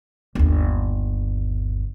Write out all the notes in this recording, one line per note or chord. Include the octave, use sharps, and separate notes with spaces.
G1 D#2